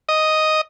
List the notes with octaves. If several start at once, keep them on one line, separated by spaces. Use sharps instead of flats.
D#5